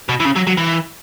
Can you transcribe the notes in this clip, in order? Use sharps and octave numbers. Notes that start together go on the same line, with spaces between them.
B2
E3
C#3
F#3
F#3
E3